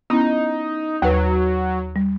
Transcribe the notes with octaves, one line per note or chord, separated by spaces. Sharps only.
B3 C#4 D#4 E4
D#2 F#3 B4
G3